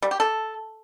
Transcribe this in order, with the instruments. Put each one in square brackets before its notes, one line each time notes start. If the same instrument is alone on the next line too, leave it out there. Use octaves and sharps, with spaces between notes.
[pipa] G3
G4
A4